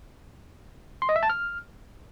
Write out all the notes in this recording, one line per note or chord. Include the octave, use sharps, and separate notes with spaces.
C6
D#5
E5
A5
F6